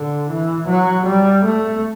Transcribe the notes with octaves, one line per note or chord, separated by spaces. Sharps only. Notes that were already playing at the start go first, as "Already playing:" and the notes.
Already playing: D3
E3
F#3
G3
A3